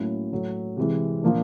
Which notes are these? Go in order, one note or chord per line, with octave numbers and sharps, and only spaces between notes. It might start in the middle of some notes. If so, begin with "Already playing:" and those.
Already playing: A2 F#3 A#3 C#4 E4
A2 F#3 A3
C3 E3 G#3
A#2 F3 A#3 D4